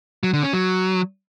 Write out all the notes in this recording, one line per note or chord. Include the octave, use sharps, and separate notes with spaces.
F#3
D3
C#4
F#3